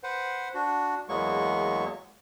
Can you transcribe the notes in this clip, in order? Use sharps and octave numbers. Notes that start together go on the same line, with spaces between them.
B4 C5 F#5
D4 F#4
E2 F#3 G#3 A#3 B3 C#6